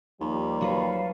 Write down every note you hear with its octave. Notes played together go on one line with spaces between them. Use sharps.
D#2 F3 G3
F#3 B4 C#5 F5 A5